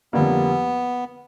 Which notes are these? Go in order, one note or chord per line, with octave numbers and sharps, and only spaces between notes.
F2 D3 G3 A#3 B3